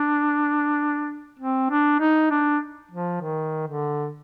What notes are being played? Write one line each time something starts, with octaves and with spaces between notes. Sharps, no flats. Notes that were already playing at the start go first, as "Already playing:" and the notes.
Already playing: D4
C4
D4
D#4
D4
F3
D#3
D3